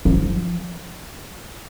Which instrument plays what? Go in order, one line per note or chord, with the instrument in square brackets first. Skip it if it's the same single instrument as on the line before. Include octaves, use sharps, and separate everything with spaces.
[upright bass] F3